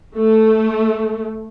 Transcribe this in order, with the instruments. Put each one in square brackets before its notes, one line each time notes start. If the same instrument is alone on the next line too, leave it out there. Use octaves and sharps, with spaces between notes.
[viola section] A3